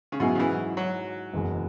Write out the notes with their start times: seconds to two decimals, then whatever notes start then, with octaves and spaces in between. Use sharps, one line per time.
0.12 C#3
0.20 G#2 B2 F#3 E4 G#4
0.35 C#3
0.39 E3
0.77 F#3
1.34 F#1 E2 B2 G#3